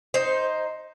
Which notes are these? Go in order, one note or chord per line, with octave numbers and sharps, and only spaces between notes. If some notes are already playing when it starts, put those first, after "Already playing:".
D#4 C5